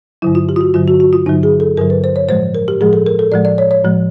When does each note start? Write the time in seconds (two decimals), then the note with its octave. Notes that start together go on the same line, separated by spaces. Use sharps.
0.22 G2 D3 F#3 E4
0.35 F4
0.49 G4
0.56 F4
0.61 F#4
0.74 G2 D3 F#3 F4
0.88 F#4
1.00 F#4
1.13 F4
1.26 G2 D3 F#3 D#4
1.43 G#4
1.60 A4
1.77 G2 D3 F#3 A#4
1.90 B4
2.04 C5
2.16 C#5
2.29 A2 F3 G#3 C5
2.55 A#4
2.68 G4
2.80 A2 F3 G#3 G#4
2.93 A4
3.06 A#4
3.19 A4
3.32 A2 F3 G#3 D5
3.45 D5
3.58 C#5
3.71 C#5
3.84 A2 F3 G#3